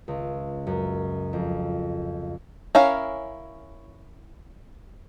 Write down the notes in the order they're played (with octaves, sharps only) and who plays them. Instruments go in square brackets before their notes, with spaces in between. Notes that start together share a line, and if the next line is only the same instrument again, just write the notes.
[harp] C#2
F#2
F2
[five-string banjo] C#4 E4 A#4 C#5 F5